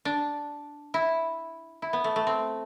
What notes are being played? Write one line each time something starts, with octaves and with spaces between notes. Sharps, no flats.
D4
E4
E4
B3
A3
A3
C4